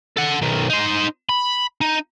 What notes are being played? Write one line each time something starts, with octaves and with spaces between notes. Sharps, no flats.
A4 F#5
B1 D#3
D#4 C5
B5
D#4